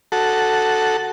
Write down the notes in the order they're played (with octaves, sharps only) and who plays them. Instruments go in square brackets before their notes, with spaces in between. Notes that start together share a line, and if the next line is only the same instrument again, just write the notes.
[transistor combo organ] F#4 A4